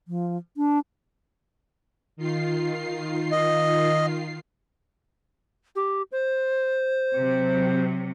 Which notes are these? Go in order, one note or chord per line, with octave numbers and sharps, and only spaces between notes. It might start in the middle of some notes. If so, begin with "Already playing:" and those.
F3
D4
D#3 F4 C7
D#5
G4
C5
C3 F#3